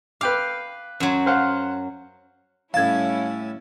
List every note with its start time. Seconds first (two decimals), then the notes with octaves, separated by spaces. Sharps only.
0.21 B4 F5 G5 D6
1.00 F#2 F#3
1.26 C5 F5 F#5
2.74 A2 G3 C#4 E4 F5 A5 G#6